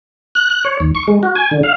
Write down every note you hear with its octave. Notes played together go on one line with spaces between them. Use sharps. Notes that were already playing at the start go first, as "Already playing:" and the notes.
F#6
F#6
C#5
D#2
C#6
G#3
F#4
G#5
D3
F5